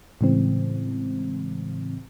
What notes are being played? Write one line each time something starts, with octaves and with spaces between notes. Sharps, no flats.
A2 C#3 E3 G#3 C4